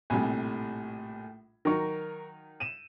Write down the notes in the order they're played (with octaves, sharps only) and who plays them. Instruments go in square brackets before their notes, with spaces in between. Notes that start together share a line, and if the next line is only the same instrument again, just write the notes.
[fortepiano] A#1 C3 G3 [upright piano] A2 G#5
[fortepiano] D#3 F#3 D#4 [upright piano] A#4 C#6
[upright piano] D#7 E7